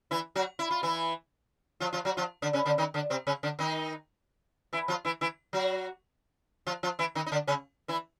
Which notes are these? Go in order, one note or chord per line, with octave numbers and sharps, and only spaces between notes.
E3 E4
F#3 F#4
E4
F4
E3 E4
F3 F4
F3 F4
F#3 F#4
F3 F4
D3 D4
C#3 C#4
D3 D4
D#3 D#4
D3 D4
C3 C4
C#3 C#4
D3 D4
D#3 D#4
E3 E4
F3 F4
E3 E4
E3 E4
F#3 F#4
F3 F4
F3 F4
E3 E4
D#3 D#4
D#4
D3 D4
C#3 C#4
E3 E4